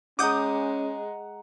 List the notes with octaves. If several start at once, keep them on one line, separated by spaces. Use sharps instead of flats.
G#3 C#4 F#5 A#5 D6 D#6 G6